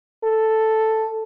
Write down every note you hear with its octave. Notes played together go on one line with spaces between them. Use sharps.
A4